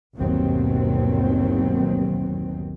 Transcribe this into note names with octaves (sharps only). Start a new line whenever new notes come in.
G1 D#2 B2 D#3 F#3 C4